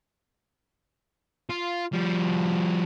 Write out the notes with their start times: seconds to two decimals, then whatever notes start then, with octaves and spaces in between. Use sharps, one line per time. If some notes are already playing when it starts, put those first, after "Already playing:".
1.50 F4
1.93 F3 G3